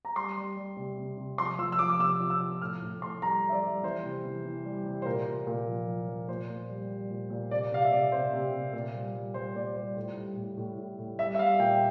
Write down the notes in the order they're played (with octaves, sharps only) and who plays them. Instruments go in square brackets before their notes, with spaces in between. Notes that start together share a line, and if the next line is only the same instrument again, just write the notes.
[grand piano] A#5
G3 C6
G3
G3
C3
C3
C3
F3 C6
F3 E6
E6
F3 D6
D6
C3 E6
F3
E6
F3
A2 F6
A2
A2 C6
G3 A#5
G3
E5
D5
G3
E3 C5
C3
E3
E3
G3
C3
C5
A#2 A#4
A#2
A#2
F3
F3
F3
A#2 C5
A#2
G3
G3
A#2
A#2
C3 D5
C3 F5
E5
C3 D5
C3 C5
C3
C3
A#2
G3
G3
G3 C5
A#2 D5
G3 C5
A2
G3
A2
A2
A2
A2
G3 E5
E5
G3 F5
A#2 G5